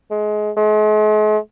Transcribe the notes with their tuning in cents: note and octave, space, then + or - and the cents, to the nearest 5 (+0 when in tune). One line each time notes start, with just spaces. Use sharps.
G#3 +25
G#3 +45